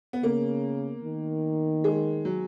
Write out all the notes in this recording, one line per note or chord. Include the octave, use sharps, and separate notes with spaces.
B3
C#3 A#3
D#3
G#3
F#3